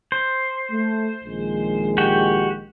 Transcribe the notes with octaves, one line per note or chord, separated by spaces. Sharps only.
C5
A3
A#1 D#3 G#3
F#4 G4 G5